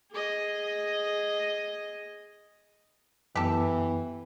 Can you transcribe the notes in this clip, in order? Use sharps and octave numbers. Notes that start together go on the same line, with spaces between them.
G#4 D#5
F#2 E3 B3 G4 A4